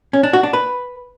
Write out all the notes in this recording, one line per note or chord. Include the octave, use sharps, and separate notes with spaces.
C#4
D4
F#4
D4
B4